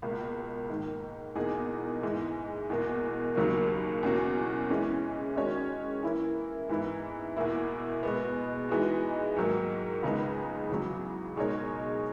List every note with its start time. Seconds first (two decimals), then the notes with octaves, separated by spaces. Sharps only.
0.02 C#2 B2 A#3
0.69 G#2 D#3 A#3
1.35 E2 B2 A#3 D#4 G#4
2.02 G#2 E3 G#3
2.70 E2 B2 A#3
3.36 D#2 C#3 F#3 A#3
4.03 E2 B2 A#3 C#4 F#4
4.70 E3 G#3 C#4
5.36 D#3 G#3 C#4 F#4 C#5
6.03 E3 A#3 E4
6.69 G#2 E3 B3 E4
7.37 E2 B2 A#3 E4
8.03 B2 G#3 B3
8.69 E3 G#3 B3 D#4 F#4
9.36 G#2 D#3 F#3 A#3
10.03 C#2 C#3 G#3 B3 D#4
10.69 E2 C#3 F#3
11.36 B2 G#3 D#4 A#4 C#5